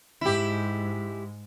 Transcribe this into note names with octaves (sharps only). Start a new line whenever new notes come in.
G#2 G#3 E4 G4